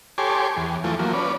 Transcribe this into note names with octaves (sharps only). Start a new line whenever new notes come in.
G4 A4 C#5 G#5 C6 D6
E2
E3 F3 A3
F3 F#3 A#3
C#4 B4 D5